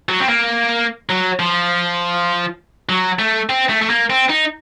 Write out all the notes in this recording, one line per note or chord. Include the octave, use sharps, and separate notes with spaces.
F#3
C4
A#3
F#3
F3
F#3
A3
C4
A3
A3
A#3
C4
D#4